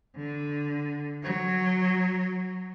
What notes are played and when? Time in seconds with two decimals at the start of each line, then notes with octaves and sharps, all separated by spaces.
0.16 D3
1.24 F#3